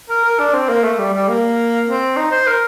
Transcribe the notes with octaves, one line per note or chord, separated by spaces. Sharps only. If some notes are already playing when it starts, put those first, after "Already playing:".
A#4
A#4
D4
C4
A#3
A3
G3
G3
A#3
C4
D#4
C5
A#4